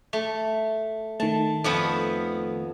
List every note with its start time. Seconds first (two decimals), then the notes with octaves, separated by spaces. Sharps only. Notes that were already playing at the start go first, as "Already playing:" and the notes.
0.13 A3
1.20 D#3 A3 A5
1.64 F2 F3 B3